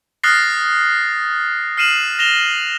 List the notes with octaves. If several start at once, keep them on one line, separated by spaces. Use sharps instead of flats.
D#6 F6 F#6 A6 A#6 C7
F6 C7 D#7 E7 F#7
A#6 E7 F7 G7